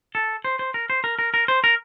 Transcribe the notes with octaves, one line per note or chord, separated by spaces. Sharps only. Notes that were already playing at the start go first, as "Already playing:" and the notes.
A4
C5
C5
A#4
C5
A#4
A#4
A#4
C5
A#4